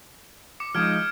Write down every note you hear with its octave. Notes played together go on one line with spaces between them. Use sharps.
D6 C#7
F3 G#3 D#4 F6 G#6 D7